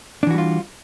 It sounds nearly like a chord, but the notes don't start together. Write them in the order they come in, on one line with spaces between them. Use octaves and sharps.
D4 E3 F#4 G3 F4